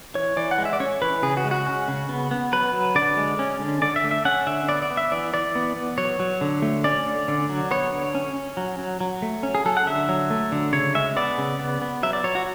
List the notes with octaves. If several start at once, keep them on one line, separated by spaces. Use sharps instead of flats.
E3 C#5
E3 D5
F#5
G#3
E5
D5
C#4 C#5
E3 B4
C#3 G#4
F#4
G#3
F#4
C#4
C#3
B3
B3
F#3 B4
F#3
D3 D5
G#3
C#4
D3
D3 D5
E5
A3
E5
C#4 F#5
D3 E5
B3 D5
D5
B3
E5
E3 D5
E3 D5
B3
B3
F#3 C#5
F#3
D3
A3
C#4 D5
D3
D3
F#3
B3 C#5
D3
C#4
C#4
F#3
F#3
F#3
A3
C#4
G#4
F#3 A4
F#5
D3 E5
F#3
A3
D3
C#3 C#5
G#3 E5
B3 D5
C#3
B3
B3
F#3 E5
D5
F#3 C#5
F#4